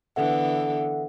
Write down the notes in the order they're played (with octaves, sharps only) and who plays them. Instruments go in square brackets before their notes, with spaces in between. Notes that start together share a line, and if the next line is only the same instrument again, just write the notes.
[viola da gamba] D3 E3 B3 [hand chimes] A4 E5 F#5